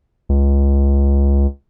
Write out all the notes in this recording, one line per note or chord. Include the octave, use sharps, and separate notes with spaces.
C#2